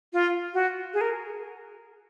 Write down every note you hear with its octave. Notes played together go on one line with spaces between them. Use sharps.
F4
F#4
G#4
A#4